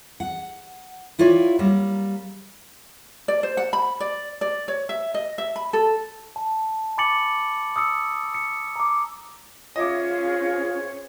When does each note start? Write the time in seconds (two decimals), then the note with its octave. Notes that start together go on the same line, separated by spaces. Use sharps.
0.20 F#5
1.19 E4 F4 G4 C#5 D5
1.59 F#3 G3 A#3
3.28 D5
3.43 C5
3.57 F#5
3.73 B5
4.00 D5
4.41 D5
4.68 C#5
4.89 E5
5.14 D#5
5.38 E5
5.56 B5
5.73 A4
6.36 A5
6.98 G#5 B5 D6 A6 C#7 F#7
7.76 D#6 E6 C#7
8.35 C#7
8.76 A#5 D6
9.76 C#4 F4 G#4 C5 C#5 D#5 E5 D6